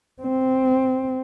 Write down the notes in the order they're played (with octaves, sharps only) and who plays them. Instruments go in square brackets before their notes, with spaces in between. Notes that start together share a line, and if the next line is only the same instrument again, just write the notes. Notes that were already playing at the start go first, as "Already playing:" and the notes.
[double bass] C4